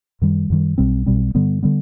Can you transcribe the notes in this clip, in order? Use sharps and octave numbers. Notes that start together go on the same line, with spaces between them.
F#2 D#3 G3
F#2 D#3 G3
B1 B2 G3 C4
B1 B2 G3 C4
G2 D3 G3 B3
D3 G3 B3